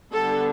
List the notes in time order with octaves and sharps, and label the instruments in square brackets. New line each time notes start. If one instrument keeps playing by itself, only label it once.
[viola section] D3 G3 B3 D4 A4